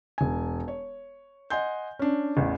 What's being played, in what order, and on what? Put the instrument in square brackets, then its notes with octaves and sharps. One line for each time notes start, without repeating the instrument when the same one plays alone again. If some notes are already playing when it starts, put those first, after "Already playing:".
[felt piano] E1 G#5
C#5
D#5 F#5 G#5 C6 G6
C#4 D4
A1 E2